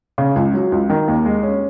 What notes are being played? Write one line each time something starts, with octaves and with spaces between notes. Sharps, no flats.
C#3
C#2
F#3
C#2
D#3
D#2
G#3
C#4